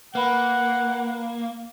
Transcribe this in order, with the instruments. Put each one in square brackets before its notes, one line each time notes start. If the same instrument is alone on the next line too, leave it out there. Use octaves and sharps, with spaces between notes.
[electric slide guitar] A#3 [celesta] B4 B5 [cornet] F#5